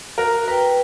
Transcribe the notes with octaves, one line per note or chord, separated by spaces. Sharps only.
F#4 A#4
B4 G5 A#5